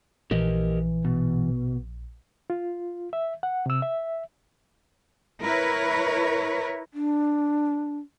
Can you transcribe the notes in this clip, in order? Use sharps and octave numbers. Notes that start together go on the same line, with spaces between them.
A#1 E3 G4 A#4 D#5
B2
F4
E5
F#5
C3 E6
E5
E4 A#4 B4 C#5
D4